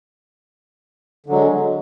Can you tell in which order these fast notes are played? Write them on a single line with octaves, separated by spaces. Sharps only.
D3 F#3 G#3